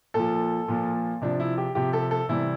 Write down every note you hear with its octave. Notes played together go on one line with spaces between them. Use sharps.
A#2 F3 A4
A#2 F3
C3 F3 D4
E4
G4
C3 F3 G4
A4
A4
C3 E3 G3 E4